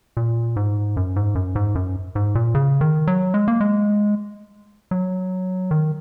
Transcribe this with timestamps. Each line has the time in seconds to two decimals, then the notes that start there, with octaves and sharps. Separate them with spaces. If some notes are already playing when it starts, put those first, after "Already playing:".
0.17 A#2
0.56 G#2
0.97 F#2
1.16 G#2
1.35 F#2
1.55 G#2
1.75 F#2
2.15 G#2
2.35 A#2
2.55 C#3
2.81 D#3
3.07 F#3
3.34 G#3
3.48 A#3
3.61 G#3
4.91 F#3
5.71 D#3